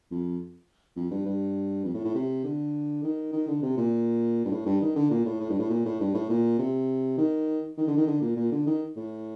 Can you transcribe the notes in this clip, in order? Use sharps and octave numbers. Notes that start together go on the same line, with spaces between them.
F2
F2
G2
G2
F2
A2
A2
C3
D3
D#3
D#3
D3
C3
A#2
G2
A2
G2
D#3
D3
A#2
A2
A2
G2
A2
A#2
A2
G2
A2
A#2
C3
D#3
D#3
D3
D#3
D3
A#2
A#2
D3
D#3
A2